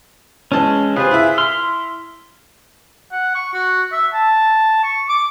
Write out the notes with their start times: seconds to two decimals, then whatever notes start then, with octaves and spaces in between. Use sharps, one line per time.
0.52 E3 G#3 C#4 A5
0.96 C3 F4 G#4 B4 C5
1.11 E4 E5
1.38 C6 F6
3.12 F#5
3.35 C#6
3.53 F#4
3.92 E5
4.13 A5
4.83 C#6
5.09 D6